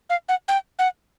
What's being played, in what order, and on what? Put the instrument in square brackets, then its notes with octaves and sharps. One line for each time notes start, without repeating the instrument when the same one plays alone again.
[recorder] F5
F#5
G5
F#5